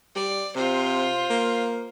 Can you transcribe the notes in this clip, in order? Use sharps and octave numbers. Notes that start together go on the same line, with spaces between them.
G3 D5
C3 F4 C5
A#3